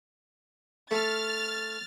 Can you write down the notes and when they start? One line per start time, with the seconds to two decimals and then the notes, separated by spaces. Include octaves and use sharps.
0.91 A3 F6 A6